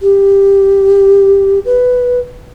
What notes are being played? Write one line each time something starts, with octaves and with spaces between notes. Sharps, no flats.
G4
B4